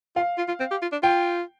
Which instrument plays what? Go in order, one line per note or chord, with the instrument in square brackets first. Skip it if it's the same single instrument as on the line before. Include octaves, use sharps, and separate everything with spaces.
[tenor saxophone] F4 [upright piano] F5
[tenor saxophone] F4
F4
C4
G4
F4
D4
[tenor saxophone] F4 [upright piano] G5